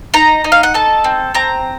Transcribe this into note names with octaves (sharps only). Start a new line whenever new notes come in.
D#4 A#5
D#4
F5
F#5
A4 A5
C4
C4 A#5